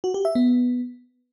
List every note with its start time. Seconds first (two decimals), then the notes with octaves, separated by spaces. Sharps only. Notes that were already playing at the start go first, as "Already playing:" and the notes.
0.04 F#4
0.14 G4
0.25 E5
0.35 B3